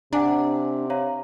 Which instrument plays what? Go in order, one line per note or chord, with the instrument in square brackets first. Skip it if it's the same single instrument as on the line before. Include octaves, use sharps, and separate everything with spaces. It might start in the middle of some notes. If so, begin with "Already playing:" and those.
[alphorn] C3 [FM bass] D4 [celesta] F#5 G#5 A#5
[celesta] C#5 F5 A#5